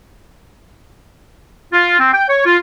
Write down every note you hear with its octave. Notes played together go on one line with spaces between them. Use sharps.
F4
C4
G5
C#5
F4